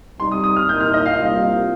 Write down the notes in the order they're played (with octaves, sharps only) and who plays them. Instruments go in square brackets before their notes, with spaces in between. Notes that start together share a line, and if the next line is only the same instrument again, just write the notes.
[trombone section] C3 G3 C4 D#4 [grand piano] C6
[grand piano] D#6
D#6
F6
[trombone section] C2 A#2 A#3 D#4 [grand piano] G6
[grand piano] F6
D#5
F5
[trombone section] C2 C3 G3 A#3 F4